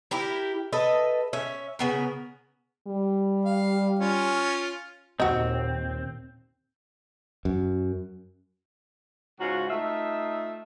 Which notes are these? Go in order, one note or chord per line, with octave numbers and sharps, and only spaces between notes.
E4 G4 A#4
A4 B4 D#5 E5
C#4 E5
C#3 B3 A#4
G3
F5
C#4 F4
D#2 A#2 C4 F#4 D#5
F#2
G#2 C#3 F4 F#4
A3 D#4 F4 E5